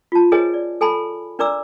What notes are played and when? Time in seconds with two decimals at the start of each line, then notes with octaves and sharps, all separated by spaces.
0.12 F4 A5
0.32 G#4 A#4 C5 C#5 D#5 G#5
0.54 D5
0.81 A4 G#5 A5 B5
1.39 D4 A#4 D5 A#5 D6 E6